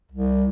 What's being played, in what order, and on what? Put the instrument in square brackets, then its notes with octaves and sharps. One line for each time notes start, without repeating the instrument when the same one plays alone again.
[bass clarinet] C2